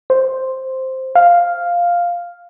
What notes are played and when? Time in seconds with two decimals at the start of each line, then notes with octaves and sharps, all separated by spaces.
0.10 C5
1.15 F5